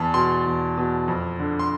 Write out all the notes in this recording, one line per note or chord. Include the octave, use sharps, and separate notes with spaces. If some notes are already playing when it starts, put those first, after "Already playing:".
Already playing: E2 A5
B2 C6
E2
B2
F2
D3
C6